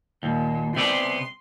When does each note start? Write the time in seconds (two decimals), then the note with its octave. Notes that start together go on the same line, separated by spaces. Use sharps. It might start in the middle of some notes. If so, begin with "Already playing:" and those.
0.23 D#2 A#2
0.76 C3 B3 D5 C6